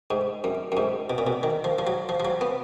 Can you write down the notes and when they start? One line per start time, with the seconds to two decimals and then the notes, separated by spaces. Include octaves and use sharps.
0.11 G#2
0.44 F#2
0.72 F#2
0.77 G#2
1.10 B2
1.18 A#2
1.27 B2
1.43 D#3
1.64 F3
1.79 F3
1.87 F#3
2.09 F3
2.20 F3
2.25 F#3
2.41 B3